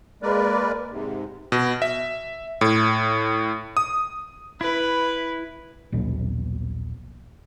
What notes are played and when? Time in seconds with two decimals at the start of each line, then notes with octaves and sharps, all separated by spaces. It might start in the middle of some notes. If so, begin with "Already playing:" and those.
0.22 G#3 A#3 A#4 B4 D5
0.91 G#2 C3
1.52 B2
1.82 E5
2.61 A2
3.77 D#6
4.61 E4 B4
5.92 A#1 D#2 B2 F#3